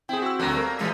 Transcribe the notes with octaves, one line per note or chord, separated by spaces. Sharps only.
C4 E4 G#4 G5
F#4 E6
D2 F#3 A#3 A4 F#6
G3 A#4
A#2 E3 F3 G#3